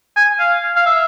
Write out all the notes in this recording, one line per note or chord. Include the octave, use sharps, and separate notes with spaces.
G#5
F5
F5
E5